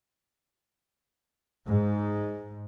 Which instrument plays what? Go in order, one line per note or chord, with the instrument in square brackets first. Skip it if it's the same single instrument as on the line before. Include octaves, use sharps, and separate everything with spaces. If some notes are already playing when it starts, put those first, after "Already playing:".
[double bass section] G#2